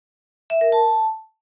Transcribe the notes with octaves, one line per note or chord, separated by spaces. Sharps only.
E5
A#4
A5